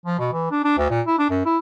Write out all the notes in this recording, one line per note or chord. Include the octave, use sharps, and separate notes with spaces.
F3
B2
E3
D4
D4
D2
A#2
E4
D4
F#2
E4